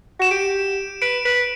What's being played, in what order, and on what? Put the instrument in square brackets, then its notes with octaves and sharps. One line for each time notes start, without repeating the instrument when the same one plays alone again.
[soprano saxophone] F#4 [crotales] E7
[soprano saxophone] G4 [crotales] D7
[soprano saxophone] B4 [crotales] D7
[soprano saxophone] B4